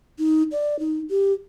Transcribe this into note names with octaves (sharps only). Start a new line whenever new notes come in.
D#4
D5
D#4
G4